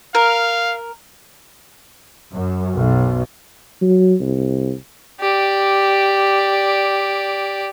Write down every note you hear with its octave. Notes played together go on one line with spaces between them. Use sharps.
A#4 F5
F#2
B1
F#3
C2
G4 D5